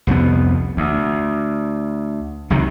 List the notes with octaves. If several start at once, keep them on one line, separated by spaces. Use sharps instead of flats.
C2 F2 F#3 B3
D2
C#2 C3 D#3 F#3